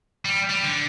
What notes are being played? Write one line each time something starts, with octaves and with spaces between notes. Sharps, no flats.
G3
G3
D3